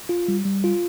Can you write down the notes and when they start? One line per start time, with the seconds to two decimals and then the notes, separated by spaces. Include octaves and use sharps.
0.09 F4
0.28 G3
0.45 G3
0.64 F4